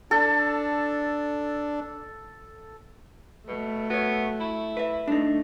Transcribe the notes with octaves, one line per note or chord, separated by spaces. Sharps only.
D4 A4
B2 A3
B3 F#4 C#5
E4
B4 E5
A3 D4 D#4